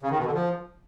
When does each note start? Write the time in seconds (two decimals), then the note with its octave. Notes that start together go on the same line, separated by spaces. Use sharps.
0.03 C#3
0.10 D#3
0.18 B2
0.26 D3
0.34 F3